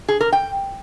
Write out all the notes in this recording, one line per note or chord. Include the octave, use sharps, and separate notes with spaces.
G#4
A#4
G5